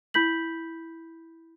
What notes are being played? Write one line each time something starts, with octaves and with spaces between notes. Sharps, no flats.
E4 B5 G6 B6 F#7